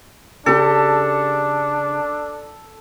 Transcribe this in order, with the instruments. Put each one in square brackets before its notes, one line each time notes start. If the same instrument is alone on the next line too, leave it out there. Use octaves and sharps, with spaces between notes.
[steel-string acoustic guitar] C#3 G4 [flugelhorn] D4 [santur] A4